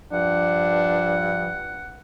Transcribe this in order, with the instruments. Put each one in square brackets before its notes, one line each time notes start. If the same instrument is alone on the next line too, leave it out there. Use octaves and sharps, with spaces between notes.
[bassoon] G2 [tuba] F3 [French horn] D4 [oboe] F#5